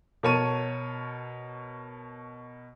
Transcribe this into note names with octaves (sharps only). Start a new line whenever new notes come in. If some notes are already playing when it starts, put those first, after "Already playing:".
B2 A#4 C#5 A5 D#7